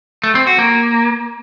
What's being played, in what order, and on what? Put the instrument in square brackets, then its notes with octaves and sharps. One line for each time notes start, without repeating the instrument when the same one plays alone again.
[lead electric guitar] A3
C4
F#4
A#3